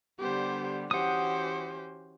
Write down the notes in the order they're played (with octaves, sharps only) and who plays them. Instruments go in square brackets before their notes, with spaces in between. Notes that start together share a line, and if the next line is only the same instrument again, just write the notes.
[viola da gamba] D3 G3 B3 [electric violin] G4 C5
[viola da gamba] E3 C#4 F#4 [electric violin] G4 C5 [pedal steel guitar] F#5 D#6